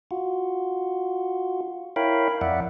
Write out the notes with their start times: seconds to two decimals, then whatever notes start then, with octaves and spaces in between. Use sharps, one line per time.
0.11 F4 F#4
1.96 E4 A#4 C#5 F5 G5 B5
2.41 F2 D5 E5 F#5